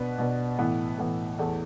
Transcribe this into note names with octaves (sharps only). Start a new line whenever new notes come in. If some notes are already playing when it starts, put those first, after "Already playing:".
Already playing: B2 B3 D4 B4
B2 B3 D4 B4
A2 E3 B3
A2 E3 B3
E2 E3 A3